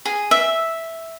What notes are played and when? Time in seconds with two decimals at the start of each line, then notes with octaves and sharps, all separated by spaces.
0.05 G#4
0.31 E5